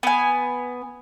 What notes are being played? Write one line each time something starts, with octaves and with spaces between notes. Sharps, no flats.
B3 G#5